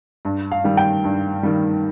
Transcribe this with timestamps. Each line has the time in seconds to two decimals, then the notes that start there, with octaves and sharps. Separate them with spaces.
0.25 G2
0.52 F5
0.64 D#3 G3
0.77 G5
1.04 G2
1.43 D#3 G3